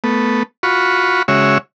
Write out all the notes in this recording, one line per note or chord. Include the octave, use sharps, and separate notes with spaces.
A3 B3
F4 F#4 B5 C#6
C#3 G#3 F#4 C#5 E5